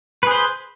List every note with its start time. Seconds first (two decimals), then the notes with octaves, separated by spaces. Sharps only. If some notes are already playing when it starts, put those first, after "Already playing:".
0.23 B4
0.27 G#4
0.31 C5